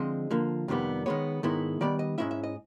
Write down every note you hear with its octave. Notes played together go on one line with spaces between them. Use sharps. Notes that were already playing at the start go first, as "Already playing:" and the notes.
Already playing: D3 F3 G#3 C4 D#5
D3 F3 A#3
F2 C3 D#3 G3 B3
D#3 G#3 B3 C#5
G#2 D#3 G#3 B3 E4
D#3 G3 B3 D5
D#5
G#2 E3 G#3 C#4 E4 E5
E5
D#5